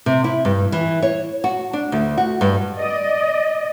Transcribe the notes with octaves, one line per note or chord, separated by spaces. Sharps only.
C3
E4
G2
E3
C#5
F#4
D4
D2
F#4
G2
D5 D#5